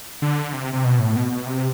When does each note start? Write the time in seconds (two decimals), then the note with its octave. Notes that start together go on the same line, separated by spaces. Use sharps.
0.22 D3
0.53 C3
0.73 C3
0.85 B2
0.99 A2
1.16 B2
1.32 B2
1.46 C3